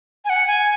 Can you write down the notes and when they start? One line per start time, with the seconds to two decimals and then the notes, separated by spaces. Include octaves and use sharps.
0.25 G#5
0.30 F#5
0.47 G#5